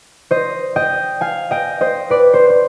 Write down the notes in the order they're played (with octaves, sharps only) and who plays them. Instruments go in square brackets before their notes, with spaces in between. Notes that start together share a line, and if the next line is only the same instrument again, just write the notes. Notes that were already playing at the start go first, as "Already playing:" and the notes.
[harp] C5 D#5
D#5 G5
F5 G#5
D#5 G5
C5 D#5
B4 D5
C5
C5